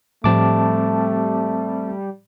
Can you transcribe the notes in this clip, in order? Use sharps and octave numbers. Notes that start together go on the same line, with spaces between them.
A2 F3 G3 A3 C4 A5 D6